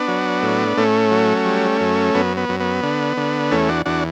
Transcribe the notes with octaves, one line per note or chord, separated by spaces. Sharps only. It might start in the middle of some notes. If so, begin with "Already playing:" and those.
Already playing: B3 D4
F#3
A2
A2 A3 C#4
F#3
G3
F#2
F#2 B3
B3
F#2
B3
D3
D3
E2 A3 C#4
D4 F#4
E2 D4 F#4